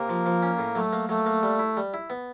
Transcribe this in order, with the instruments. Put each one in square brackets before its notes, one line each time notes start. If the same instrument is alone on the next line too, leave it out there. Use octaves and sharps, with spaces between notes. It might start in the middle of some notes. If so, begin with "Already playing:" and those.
Already playing: [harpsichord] C3 [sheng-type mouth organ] A#3
[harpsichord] F3
F3
C#4
A2
[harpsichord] F#3 [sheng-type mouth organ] A3
[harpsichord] A#3
[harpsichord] F#3 [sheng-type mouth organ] A3
[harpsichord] A#3
G3
E4
G3
E4
B3